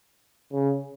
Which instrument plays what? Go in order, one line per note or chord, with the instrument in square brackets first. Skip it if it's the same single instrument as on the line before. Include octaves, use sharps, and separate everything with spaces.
[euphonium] C#3